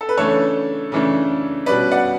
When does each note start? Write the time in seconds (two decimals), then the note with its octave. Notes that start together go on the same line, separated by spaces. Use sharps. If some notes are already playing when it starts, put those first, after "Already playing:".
0.01 A4
0.09 B4
0.17 C#3 E3 A3 D4 A4 C#5
0.92 C#3 E3 A3 D4
1.66 B2 G3 C#4 B4 D5
1.91 D5 F#5